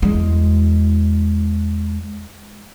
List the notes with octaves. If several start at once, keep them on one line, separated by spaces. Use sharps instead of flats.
E2 G#3